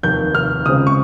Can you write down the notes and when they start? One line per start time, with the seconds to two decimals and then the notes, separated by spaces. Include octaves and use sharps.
0.03 F1 D#2 D#3 G6
0.35 F6
0.66 C#2 C#3 G#3 C4 D#6
0.87 C#6